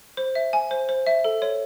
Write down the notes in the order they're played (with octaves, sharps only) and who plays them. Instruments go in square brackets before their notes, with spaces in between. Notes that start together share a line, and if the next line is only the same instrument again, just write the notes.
[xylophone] C5
E5
G#5
C5
C5
E5
A4
C#5